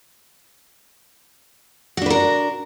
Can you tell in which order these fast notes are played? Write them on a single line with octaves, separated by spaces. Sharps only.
F#4 D4 B4 A#4